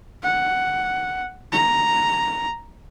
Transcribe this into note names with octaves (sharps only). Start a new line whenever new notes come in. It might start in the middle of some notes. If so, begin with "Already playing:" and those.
F#5
A#5